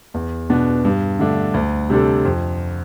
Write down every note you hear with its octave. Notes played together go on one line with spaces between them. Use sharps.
E2
B2 B3 D4
G2
D3 A3 D4
D2
C3 G3 D4 A4
F2